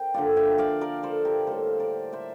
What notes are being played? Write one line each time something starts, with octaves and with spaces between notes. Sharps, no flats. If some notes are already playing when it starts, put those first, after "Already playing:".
Already playing: A#4 C5 G5
D3 F3 A#3 D5 F5
E5 G5
D5 F5
A#4 D5
A4 C5
G4 A#4
A2 G3 A#3 A4 C5
A#4 D5
C5 E5